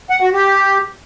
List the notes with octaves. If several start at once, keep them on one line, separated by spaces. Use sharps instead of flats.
F#5
F#4
G4